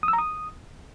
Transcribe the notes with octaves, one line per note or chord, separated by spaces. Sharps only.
D#6
E6
A#5
D#6